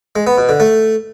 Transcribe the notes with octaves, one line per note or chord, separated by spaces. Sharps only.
G#3
B3
B2
D3
A3